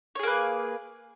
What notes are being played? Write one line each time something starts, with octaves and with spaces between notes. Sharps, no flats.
A#3 G#4 B4 C#5